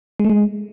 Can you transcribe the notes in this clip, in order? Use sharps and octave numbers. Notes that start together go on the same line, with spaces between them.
G#3
A3
G#3